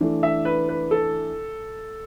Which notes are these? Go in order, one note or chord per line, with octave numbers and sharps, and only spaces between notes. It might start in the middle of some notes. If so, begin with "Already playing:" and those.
E3 A3 D4
E5
B4
B4
A4